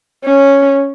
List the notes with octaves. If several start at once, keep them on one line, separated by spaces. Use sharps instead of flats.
C#4